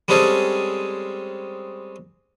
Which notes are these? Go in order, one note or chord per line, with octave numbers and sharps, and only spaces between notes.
G3 G#3 C4 C#4 G#4 A4